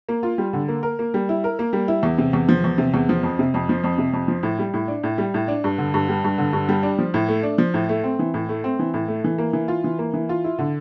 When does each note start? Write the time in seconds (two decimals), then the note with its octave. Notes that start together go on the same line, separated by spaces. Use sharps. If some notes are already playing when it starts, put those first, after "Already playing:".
0.09 A#3
0.23 F4
0.38 G3
0.53 D3
0.68 A#3
0.83 A#4
0.99 A#3
1.14 G3
1.29 E4
1.44 A#4
1.59 A#3
1.73 G3
1.88 E4
2.03 E2
2.18 C3
2.33 E2
2.49 F3
2.64 E2
2.78 C3
2.94 E2
3.09 F3
3.23 F2
3.39 C3
3.54 F2
3.69 F3
3.84 F2
3.98 C3
4.13 F2
4.28 F3
4.43 A2
4.59 G3
4.74 A2
4.88 D4
5.03 A2
5.18 G3
5.34 A2
5.48 D4
5.64 G2
5.78 D3
5.94 G2
6.09 G3
6.24 G2
6.38 D3
6.53 G2
6.69 G3
6.83 D4
6.98 F3
7.14 A2
7.28 A3
7.43 D4
7.58 F3
7.74 A2
7.89 A3
8.04 C4
8.19 E3
8.34 A2
8.49 A3
8.64 C4
8.79 E3
8.94 A2
9.08 A3
9.24 E3
9.38 A#3
9.53 E3
9.68 F4
9.84 E3
9.99 A#3
10.14 E3
10.29 F4
10.44 E4
10.59 D3